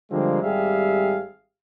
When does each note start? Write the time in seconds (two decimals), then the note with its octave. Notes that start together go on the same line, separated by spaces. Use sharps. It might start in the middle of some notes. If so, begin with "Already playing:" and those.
0.11 D3 F3 G3 G#3 A#3 C4
0.41 G#1 G3 G4 G#4 E5 F5